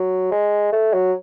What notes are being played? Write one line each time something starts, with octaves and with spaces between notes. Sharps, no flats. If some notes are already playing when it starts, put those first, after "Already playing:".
Already playing: F#3
G#3
A3
F#3